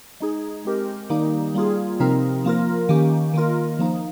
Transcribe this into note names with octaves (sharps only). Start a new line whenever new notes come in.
G#3 D#4 G#4
G#3 C4 G4 A#4
D#3 G3 A#3 D#4 G4
G3 A#3 F4 G#4
C3 F3 C4 D#4 A#4
F3 A#3 F4 A#4
D#3 A#3 C#4 G4
D#3 A#3 F4 A#4
F3 A#3 D#4